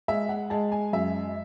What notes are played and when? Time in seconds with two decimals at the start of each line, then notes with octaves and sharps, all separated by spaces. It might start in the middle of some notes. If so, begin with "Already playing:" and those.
0.08 G#3 E5
0.29 F#5
0.50 G#3 A5
0.72 G#5
0.93 F#2 E5